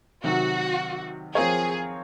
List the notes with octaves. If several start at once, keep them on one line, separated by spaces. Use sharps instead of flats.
C3 D#3 F#3 F#4
F3 C4 F4 G#4 A#4 C#5